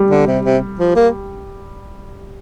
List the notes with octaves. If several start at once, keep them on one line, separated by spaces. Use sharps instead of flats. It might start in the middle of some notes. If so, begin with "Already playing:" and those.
Already playing: G3
D3
C3
C3
F3
A#3